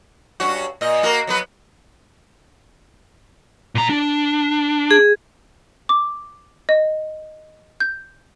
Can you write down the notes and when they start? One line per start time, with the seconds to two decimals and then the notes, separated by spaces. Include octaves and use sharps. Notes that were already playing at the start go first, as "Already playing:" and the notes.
0.40 G2 C#4 F#4
0.81 A#2 D#5
1.03 A#3 F#4 A#4
1.27 F#3 B3 B4
3.75 A#2 A#5
3.89 D4
4.91 G#4
5.89 D6
6.69 D#5
7.80 G6